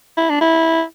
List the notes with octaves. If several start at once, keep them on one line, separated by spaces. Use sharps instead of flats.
E4
D4
E4